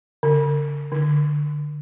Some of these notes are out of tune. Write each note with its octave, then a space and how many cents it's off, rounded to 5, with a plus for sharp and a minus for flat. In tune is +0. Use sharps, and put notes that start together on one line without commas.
D3 -45
D3 +10